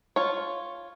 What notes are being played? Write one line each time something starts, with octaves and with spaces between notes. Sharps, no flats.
F4 C#5